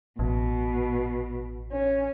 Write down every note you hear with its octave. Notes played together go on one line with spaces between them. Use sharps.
A1 B2
C#4